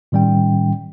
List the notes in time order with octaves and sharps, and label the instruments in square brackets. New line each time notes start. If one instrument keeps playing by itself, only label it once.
[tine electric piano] A2 D#3 G3 C#4 G5